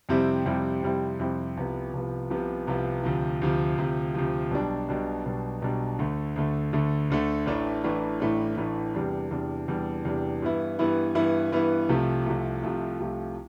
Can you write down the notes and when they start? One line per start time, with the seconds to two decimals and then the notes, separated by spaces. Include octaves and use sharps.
0.09 F2 C3 G3 C4 E4
0.46 F2 C3 G3 C4 E4
0.83 F2 C3 G3 C4 E4
1.19 F2 C3 G3 C4 E4
1.57 C2 C3 F3 B3
1.94 C2 C3 F3 B3
2.30 C2 C3 F3 B3
2.67 C2 C3 F3 B3
3.03 D2 C3 F3
3.42 D2 C3 F3
3.78 D2 C3 F3
4.14 D2 C3 F3
4.51 B1 B2 G3 D4
4.89 B1 B2 G3 D4
5.25 B1 B2 G3 D4
5.62 B1 B2 G3 D4
5.99 D2 D3 A3
6.36 D2 D3 A3
6.73 D2 D3 A3
7.10 D2 D3 A3
7.46 A1 A2 E3 A3 D4
7.84 A1 A2 E3 A3 D4
8.20 A1 A2 E3 A3 D4
8.57 A1 A2 E3 A3 D4
8.95 E2 C3 G3 D4
9.31 E2 C3 G3 D4
9.68 E2 C3 G3 D4
10.05 E2 C3 G3 D4
10.42 G2 E3 B3 E4
10.79 G2 E3 B3 E4
11.15 G2 E3 B3 E4
11.52 G2 E3 B3 E4
11.89 C2 C3 F3 A3
12.26 C2 C3 F3 A3
12.63 C2 C3 F3 A3
13.00 C2 C3 F3 A3